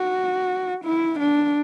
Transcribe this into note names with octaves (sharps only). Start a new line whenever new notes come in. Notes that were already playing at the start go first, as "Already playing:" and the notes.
Already playing: F#4
E4
D4